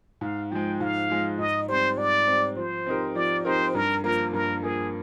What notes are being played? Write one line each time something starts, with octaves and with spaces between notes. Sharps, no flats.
G#2 F5
F3 G#3 G5
G#2 F5
F3 G#3
G#2 D#5
G3 C4 C5
G#2 D5
G3 C4
F3 C5
C4 D#4 G4 A#4
F3 D5
C4 D#4 G4 A#4 C5
G2 A#4
F3 A#3 A#4
G2 A#4
F3 A#3 G#4